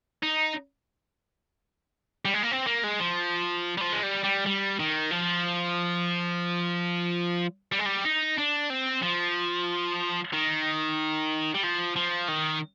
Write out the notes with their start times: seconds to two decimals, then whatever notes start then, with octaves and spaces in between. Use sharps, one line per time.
0.23 D#4
2.25 G3
2.34 G#3
2.43 A#3
2.51 C4
2.67 A#3
2.84 G#3
3.00 F3
3.78 G3
3.81 F3
3.93 G#3
4.03 G3
4.24 G3
4.46 G3
4.79 D#3
5.11 F3
7.72 G3
7.79 G#3
7.86 G3
8.05 D#4
8.38 D4
8.70 C4
9.02 F3
10.33 D#3
11.54 G3
11.63 F3
11.96 F3
12.28 D#3